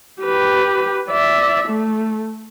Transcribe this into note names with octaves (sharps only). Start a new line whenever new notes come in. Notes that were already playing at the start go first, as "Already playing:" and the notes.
G4 B4
D5 E5
A3